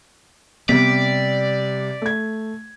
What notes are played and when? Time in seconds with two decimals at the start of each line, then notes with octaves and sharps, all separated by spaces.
0.69 C3 G3 B3 D5 B6
2.02 A3 G#6